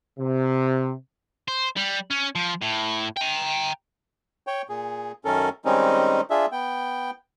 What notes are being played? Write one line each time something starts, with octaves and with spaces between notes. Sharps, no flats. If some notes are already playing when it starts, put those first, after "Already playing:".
C3
C5
G3
C#4
F3
A2
G5 A#5
C#5 G5
A#2 G#4
F#2 D#3 C#4 A4 A#4
D#3 G3 G#3 C4 C#4 D#4
D4 F4 G#4 E5
B3 G5